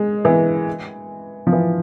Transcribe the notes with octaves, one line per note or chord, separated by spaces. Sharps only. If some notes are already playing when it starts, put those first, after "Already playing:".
Already playing: G#3
E3
F3
E3